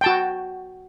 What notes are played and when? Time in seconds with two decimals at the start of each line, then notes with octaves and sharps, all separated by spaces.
0.01 G5
0.04 A5
0.06 F#4